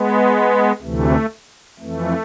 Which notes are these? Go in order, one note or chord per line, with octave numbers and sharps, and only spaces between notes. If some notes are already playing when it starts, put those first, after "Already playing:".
Already playing: G#3 B3
D2 C3 E3 A3
F2 E3 A3